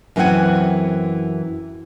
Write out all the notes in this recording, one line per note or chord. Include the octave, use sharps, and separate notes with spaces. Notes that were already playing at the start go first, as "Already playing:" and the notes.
F#2 E3 C4 C#4 F#5 G#5